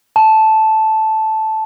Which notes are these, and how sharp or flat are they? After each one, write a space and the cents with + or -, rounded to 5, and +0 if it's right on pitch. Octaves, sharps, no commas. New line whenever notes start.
A5 -5